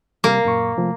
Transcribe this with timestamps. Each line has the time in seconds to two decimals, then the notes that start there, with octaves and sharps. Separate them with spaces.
0.24 C3 G3 A#3
0.45 F#2 A#2 C#6
0.77 C3 F3 A3